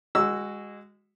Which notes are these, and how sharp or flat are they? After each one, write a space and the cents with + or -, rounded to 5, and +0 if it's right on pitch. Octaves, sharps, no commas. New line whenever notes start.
G#3 -20 F#4 +5 E6 +0